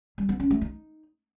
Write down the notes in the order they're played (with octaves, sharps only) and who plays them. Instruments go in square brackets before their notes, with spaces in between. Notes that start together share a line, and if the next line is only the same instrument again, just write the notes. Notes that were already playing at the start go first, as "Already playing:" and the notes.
[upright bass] G3
B3
C#4
A3
D#4